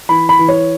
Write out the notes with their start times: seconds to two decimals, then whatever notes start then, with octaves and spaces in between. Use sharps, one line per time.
0.09 E3 B5
0.29 B5
0.39 E3
0.49 C#5